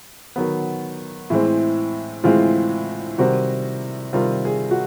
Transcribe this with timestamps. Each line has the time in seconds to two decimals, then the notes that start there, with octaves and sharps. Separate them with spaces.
0.36 D#3 F#3 B3
1.30 A2 E3 G#3 C4
2.24 A2 E3 G#3 C4 F4
3.18 C3 D#3 G3 C4 F#4
4.13 C3 D#3 G3 C4 F4
4.45 G#4
4.71 F#4